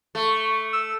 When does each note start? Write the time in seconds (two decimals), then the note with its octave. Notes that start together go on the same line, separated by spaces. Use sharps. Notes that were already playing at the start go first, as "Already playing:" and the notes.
0.15 A3 C#6
0.73 E6